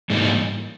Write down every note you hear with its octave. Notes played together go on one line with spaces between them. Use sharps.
G#2 E3 G3 A#3 D#4